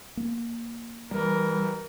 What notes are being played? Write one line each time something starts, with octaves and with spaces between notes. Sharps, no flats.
A#3
E3 G3 A#4